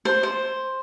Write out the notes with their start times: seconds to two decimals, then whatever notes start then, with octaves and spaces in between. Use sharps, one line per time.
0.05 C5
0.23 C5